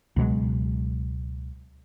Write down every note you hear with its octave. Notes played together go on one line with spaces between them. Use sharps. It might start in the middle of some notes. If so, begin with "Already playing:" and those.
C#2 B2 F#3 G#3